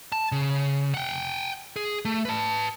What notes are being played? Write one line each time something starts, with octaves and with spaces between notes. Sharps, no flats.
A5
C#3
F#5 G5
G#4
A3
B4 A5